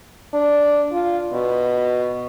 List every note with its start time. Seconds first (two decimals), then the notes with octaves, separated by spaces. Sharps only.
0.34 D4
0.92 F4
1.33 B2